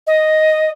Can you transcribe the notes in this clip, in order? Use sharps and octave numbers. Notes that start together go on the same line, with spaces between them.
D#5